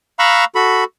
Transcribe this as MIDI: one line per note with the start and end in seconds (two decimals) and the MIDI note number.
0.19 0.45 77
0.19 0.45 82
0.19 0.45 83
0.19 0.45 85
0.19 0.45 88
0.19 0.45 90
0.55 0.84 66
0.55 0.84 69
0.55 0.84 83